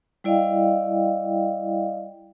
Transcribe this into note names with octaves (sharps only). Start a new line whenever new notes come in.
G3 E4 D5 D#5 F5 G5